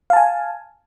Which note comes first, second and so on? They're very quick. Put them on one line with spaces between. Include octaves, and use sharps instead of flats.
F5 A5 G#5